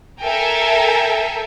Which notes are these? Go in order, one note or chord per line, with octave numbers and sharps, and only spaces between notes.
A4 A#4 E5 G5 G#5 A#5